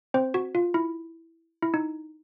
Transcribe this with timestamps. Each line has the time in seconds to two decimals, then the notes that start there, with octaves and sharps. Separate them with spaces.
0.14 C4 C5
0.34 F#4
0.55 F4
0.74 E4
1.62 E4
1.74 D#4